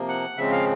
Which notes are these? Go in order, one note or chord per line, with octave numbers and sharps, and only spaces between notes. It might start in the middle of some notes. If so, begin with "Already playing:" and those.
Already playing: C3 F3 A#3
F#5
C#3 F3 G#3 C4 E5
F5